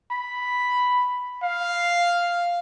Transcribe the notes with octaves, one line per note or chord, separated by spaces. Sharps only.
B5
F5